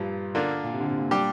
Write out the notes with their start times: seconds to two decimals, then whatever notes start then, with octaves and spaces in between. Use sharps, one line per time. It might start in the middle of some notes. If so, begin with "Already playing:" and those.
Already playing: G2 A#2 F3
0.35 D3 A#3 D4 F4
0.64 A#2
0.73 C3
0.80 D3
0.86 C3
0.98 A#2
1.11 G3 D4 G4